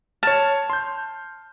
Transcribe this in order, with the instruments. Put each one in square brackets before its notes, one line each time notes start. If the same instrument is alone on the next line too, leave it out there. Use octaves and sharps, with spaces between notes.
[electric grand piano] C#5 F6 [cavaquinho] A5
[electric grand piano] C6 G6